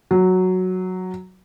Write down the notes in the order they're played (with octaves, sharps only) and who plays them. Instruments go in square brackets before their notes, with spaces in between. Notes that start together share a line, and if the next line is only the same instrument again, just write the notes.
[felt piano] F#3